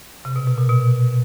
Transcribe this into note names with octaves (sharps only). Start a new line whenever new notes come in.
C3
B2
B2
A#2
B2